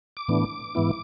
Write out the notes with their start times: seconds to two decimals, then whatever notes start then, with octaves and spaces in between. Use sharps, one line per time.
0.17 D6
0.28 A2 E3 B3 D4
0.75 G#2 E3 B3 E4